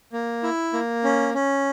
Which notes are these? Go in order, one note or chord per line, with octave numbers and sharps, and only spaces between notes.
A#3
E4
A#3
C#4
C#4